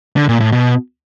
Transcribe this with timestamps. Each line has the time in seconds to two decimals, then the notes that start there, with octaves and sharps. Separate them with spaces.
0.17 D3
0.29 A#2
0.40 A2
0.52 B2